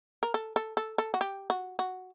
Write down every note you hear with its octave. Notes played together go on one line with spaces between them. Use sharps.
A#4
A4
A4
A4
A4
F#4
G4
F#4
F#4